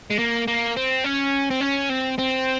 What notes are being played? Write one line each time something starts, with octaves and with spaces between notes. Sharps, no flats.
G#3
A#3
A#3
C4
C#4
C4
C#4
C4
C4